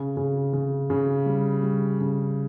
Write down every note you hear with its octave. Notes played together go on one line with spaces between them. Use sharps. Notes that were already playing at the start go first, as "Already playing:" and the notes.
Already playing: C#3
C#3
C#3
C#3
G3
G3
C#3